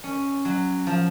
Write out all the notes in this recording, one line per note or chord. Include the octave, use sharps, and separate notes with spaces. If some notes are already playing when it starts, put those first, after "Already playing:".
C#4
F#3
F3